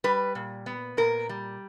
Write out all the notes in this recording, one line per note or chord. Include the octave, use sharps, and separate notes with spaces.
G3 B4
A#2
B3
A#2 A#4
G3